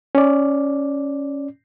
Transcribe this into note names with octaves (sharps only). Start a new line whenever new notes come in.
C#4 D5